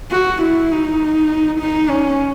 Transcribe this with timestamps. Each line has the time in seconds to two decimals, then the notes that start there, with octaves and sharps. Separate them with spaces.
0.11 F#4
0.42 E4
0.71 D#4
1.59 D#4
1.89 C#4